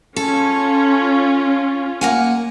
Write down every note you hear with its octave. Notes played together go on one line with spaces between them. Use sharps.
C#4 F4 A4
A#3 F#5 G#5